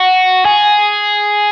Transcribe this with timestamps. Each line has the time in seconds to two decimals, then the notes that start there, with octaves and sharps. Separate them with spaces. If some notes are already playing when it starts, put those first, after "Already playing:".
Already playing: F#4
0.45 G#4